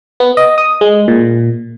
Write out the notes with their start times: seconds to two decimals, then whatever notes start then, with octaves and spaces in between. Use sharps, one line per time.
0.20 B3
0.37 D#5
0.58 D#6
0.81 G#3
1.08 A#2